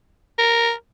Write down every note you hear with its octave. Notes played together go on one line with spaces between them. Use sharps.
A#4